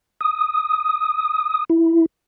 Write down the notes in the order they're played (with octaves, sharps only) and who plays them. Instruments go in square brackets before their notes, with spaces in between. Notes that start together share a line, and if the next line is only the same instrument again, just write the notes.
[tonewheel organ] D#6
E4